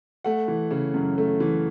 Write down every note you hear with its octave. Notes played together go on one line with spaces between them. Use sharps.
A3 F#5
E3
C#3
F#2
A3
E3